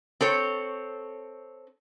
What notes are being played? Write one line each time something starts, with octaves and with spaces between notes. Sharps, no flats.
C4 A4 C#5